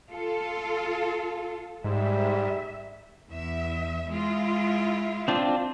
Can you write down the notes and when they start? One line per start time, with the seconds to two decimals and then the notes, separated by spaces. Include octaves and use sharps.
0.10 F4 A4
1.84 G#2 G3 E5
3.30 E2 E5
4.08 G#3 E4 F4
5.28 C4 D4 F4